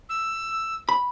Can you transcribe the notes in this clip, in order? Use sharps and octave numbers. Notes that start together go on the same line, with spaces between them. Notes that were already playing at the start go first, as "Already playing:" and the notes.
E6
B5